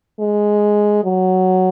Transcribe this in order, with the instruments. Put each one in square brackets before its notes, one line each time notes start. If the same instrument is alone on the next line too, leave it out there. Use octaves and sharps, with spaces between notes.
[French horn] G#3
F#3